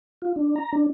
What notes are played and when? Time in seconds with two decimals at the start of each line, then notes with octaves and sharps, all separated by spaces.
0.22 F4
0.36 D4
0.56 A#5
0.73 D4